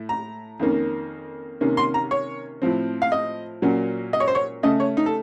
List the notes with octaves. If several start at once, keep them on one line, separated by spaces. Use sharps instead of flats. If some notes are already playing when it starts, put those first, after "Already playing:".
Already playing: A2 A3
A#5
F2 D#3 A#3 C#4
C3 D#3 A#3 C#4
C6
A#5
C#5
A2 F3 C4
F5
D#5
A#2 F#3 A#3 C#4
D#5
C#5
C5
C#5
C#3 A3 C#4 D#5
C#5
D#4
A4